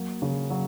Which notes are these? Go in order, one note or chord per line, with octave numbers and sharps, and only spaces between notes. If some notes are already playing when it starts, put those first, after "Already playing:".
Already playing: F#3 A#3
C#3
F#3